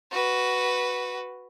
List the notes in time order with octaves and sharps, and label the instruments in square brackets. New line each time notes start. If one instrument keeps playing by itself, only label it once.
[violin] F#4 B4